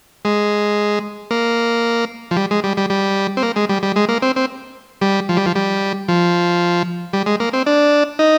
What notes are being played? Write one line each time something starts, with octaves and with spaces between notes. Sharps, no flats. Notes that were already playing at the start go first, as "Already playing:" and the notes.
G#3
A#3
F3
G3
G#3
G3
G3
G3
C4
A#3
G#3
G3
G3
G#3
A#3
C4
C4
G3
F3
G3
F3
G3
F3
G3
G#3
A#3
C4
D4
D#4